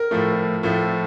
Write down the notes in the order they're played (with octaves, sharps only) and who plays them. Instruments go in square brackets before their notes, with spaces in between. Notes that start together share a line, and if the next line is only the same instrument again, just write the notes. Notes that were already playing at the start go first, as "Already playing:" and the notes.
Already playing: [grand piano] A#4
A2 F3 A3
A2 F3 A3